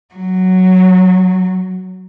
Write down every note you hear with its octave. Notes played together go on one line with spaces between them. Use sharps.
F#3